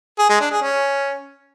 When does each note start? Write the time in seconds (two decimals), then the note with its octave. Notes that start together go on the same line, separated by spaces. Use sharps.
0.19 G#4
0.30 G#3
0.40 D4
0.51 G#4
0.62 C#4